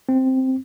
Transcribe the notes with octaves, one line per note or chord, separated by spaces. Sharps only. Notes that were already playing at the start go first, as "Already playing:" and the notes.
C4